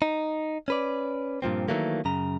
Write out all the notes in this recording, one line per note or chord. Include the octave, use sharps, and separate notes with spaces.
D#4
C#4 B4 D5
G2 A#2 F3 C4
D#3 E3 F#3 A3 A#3
F#2 C#3 A#5